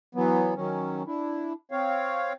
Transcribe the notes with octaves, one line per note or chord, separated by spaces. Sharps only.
E3 F#3 B3
D#3 F#3 C#4
D4 E4
C4 C#5 F5